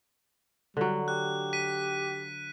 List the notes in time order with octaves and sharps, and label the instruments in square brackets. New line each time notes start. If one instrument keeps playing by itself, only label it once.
[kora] D3 F#3 [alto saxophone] G3
[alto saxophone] G4 [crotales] F#6
[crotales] B6 D#7